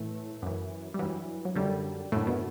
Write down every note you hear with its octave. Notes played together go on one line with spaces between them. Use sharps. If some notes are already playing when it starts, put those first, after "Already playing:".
Already playing: A2 E3 A3
F#2 E3
G3
G2 E3 F#3
F#3
F#2 D3 G3
F#2 A2 D3 A3
B2 B3